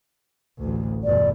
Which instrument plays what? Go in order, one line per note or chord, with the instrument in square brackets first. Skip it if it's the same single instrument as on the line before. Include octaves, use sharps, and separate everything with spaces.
[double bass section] A1 D2
[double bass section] G1 E2 B2 [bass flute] D5